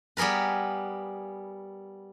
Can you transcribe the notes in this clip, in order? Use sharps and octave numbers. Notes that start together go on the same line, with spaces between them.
G3 B3 G#4 A#4 B4